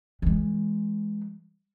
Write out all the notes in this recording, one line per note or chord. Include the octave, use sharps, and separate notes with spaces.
E3 G#3